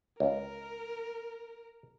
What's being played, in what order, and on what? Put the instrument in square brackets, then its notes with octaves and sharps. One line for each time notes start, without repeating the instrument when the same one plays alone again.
[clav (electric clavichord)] C#2 [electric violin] A#4